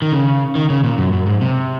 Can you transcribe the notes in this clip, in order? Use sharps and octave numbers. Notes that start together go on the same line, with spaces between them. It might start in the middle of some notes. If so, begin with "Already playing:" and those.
D#3
C#3
D#3
C#3
A#2
F#2
F#2
G#2
C3